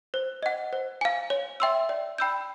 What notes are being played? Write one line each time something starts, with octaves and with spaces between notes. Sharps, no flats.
C5
D#5 F#5
C5
F5 G#5
C#5
E5 G5 C6 E6
D5
G5 B5 E6 G6